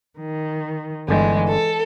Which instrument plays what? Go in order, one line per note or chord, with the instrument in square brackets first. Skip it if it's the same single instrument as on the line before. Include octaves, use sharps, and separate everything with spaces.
[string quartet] D#3
[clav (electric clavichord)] G1 D3 G5 [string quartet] E3 G#3
[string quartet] A4